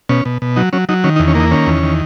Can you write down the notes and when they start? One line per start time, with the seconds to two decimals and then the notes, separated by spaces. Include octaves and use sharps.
0.09 B2 C#4
0.25 B2
0.42 B2
0.56 F#3 D#4
0.73 F#3 C#4
0.89 F#3 D#4
1.04 D#3 C#4
1.16 D#4
1.19 E2
1.28 C#4
1.35 A#3 D#4
1.51 D#3 C#4
1.67 E2
1.83 D#3